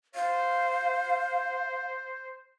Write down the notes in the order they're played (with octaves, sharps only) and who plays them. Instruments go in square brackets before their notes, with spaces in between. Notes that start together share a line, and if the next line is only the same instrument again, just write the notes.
[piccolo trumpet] C5 [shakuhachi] F5